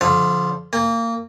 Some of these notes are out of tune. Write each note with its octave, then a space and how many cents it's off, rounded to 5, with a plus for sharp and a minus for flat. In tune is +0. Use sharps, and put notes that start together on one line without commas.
D3 -35 F3 +0 F5 -35
A#3 -20 G5 +45